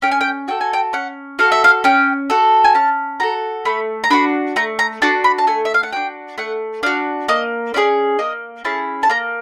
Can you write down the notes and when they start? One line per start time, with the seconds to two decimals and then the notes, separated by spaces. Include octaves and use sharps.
0.02 C#4 G5
0.11 G#5
0.21 G5
0.48 F#4 A4 G5
0.61 G#5
0.73 G5
0.93 C#4 F#5
1.39 F#4 A4 F5
1.52 E5
1.64 F5
1.84 C#4 G5
2.30 F#4 A4
2.64 G#5
2.75 C#4 A5
3.20 F#4 A4 A#5
3.65 A3 B5
4.04 A#5
4.10 D4 F#4 B5
4.56 A3 A#5
4.79 A#5
5.02 D4 F#4 A5
5.24 B5
5.38 A5
5.47 A3 G#5
5.65 E5
5.74 F5
5.83 F#5
5.93 D4 F#4 G5
6.38 A3 F#5
6.83 D4 F#4 F5
7.28 A#3 D#5
7.74 C#4 E4 G#4 D5
8.19 A#3 D#5
8.65 C#4 E4 G#4 A5
9.03 A5
9.10 A#3 A#5